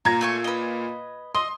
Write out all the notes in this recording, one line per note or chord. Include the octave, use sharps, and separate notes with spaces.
A#2 A#5 G#6
A3 G#5 C#6
B4 D#5
D#5 C6